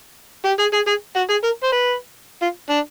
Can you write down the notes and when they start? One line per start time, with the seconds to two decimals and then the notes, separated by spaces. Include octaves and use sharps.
0.45 G4
0.59 G#4
0.73 G#4
0.87 G#4
1.16 F#4
1.30 G#4
1.44 A#4
1.63 C5
1.72 B4
2.42 F4
2.70 D4